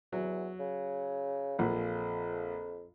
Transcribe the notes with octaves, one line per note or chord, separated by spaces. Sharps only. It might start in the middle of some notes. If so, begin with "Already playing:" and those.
E2 F#3
C#3
A#1 F2 A#2 F#5